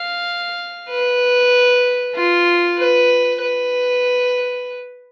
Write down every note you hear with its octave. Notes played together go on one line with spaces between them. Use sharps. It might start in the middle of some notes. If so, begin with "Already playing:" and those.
Already playing: F5
B4
F4
B4
B4